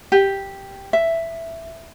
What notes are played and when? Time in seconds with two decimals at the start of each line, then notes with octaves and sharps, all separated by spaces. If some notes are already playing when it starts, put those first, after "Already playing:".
0.12 G4
0.93 E5